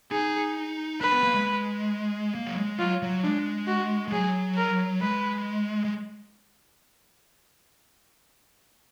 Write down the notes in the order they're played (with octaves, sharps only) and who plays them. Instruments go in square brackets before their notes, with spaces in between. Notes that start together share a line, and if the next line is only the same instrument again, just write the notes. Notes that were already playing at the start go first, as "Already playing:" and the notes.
[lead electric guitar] D#4 [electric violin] G#4
[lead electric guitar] D4 [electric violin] B4
[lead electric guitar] B3
A#3
G#3
A#3
F#3
G#3
[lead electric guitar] F#3 [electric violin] F4
[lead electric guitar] F#3
[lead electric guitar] G#3 [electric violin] D4
[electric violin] F#4
[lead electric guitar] G#3
[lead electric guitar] F#3 [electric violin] G#4
[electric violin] A#4
[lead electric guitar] G#3 [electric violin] B4
[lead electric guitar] G#3